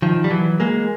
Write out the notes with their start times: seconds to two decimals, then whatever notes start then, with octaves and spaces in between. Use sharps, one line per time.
0.02 D#3 F3
0.24 G3
0.31 E3 F#3
0.60 G#3 A#3